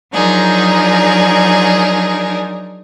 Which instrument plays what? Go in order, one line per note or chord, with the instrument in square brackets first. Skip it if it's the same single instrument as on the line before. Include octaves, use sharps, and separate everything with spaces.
[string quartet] F3 F#3 D4 D#4 G#4 A#4